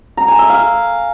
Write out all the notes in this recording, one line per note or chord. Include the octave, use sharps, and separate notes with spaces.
A#5
G#5
E5
F5